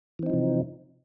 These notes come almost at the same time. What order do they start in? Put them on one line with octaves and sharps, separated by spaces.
E3 C4 D#4 F3 C3